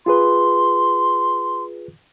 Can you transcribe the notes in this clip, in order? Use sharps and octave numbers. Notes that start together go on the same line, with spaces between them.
F4 G#4 B4 C6